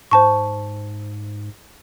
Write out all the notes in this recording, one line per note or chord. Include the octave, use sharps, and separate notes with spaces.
G#2 C5 A5 C#6